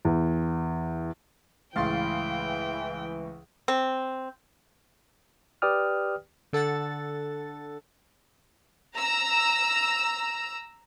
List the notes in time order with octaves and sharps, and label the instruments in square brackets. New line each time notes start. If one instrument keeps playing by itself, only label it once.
[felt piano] E2
[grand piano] C#2 A2 A6 [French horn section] E3 [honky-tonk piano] F5 C6 [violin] G5
[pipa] C4
[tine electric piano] G4 B4 D5 G5 D#6 F6
[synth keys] D3 A4 F#5 A6
[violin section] A#5 E6